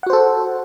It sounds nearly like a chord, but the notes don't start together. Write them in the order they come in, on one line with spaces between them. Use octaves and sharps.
F#5 F#4 C5 A4